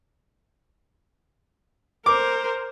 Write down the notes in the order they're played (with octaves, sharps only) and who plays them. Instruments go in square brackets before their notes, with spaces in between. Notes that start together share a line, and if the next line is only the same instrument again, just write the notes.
[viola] A#4 C5 [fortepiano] D6